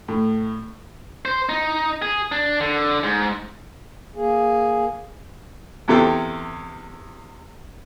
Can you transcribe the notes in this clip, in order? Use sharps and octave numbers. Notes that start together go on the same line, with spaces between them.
A2
C5
D#4
G#4
D4
D3
G#2
A#3 G#4
E2 C3 A4 G5